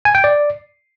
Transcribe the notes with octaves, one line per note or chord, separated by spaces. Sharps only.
G#5
G5
D5